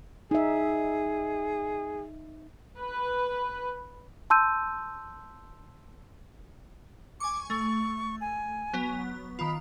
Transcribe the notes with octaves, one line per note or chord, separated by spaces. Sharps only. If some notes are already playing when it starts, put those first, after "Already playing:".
D#4 G#4 E5
B4
A5 C6 E6 G6 D#7
G#5 C#6 D6
A3 C#6
G#5
F#3 B3
D#3 F4 B5